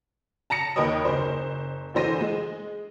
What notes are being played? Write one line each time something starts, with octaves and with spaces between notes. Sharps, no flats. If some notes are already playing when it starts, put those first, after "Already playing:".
A5 A#5 A#6 C#7
D#2 D#3 A#4 B4 C#5 D#5
F#1 C5
D2 E3 C5 A#6 D#7
G#3